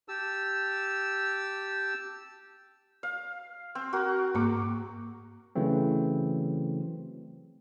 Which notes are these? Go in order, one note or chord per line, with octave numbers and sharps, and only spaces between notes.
G4 A5 E6
F5
C4
F#4 A#4
G#2 A#3 D6
C#3 E3 F#3 A3 C4